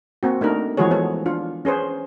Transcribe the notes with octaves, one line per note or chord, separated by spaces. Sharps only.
A#3 C4 F#4
A3 D4 D#4 A#4
E3 F3 G#3 F#4 G#4 C#5
B3 A4 C#5
D4 F4
C#4 G#4 B4 C5